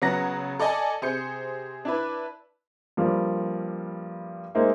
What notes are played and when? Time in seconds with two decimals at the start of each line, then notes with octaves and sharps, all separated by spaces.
0.02 C#3 F#3 B3 F#5 A#5 A#6
0.59 A4 D5 D#5 G#5
1.02 C3 G#4 C5 G6 C#7
1.85 D4 E4 B4
2.97 G2 F3 G3 A#3
4.55 G#3 A#3 D#4 C5 E5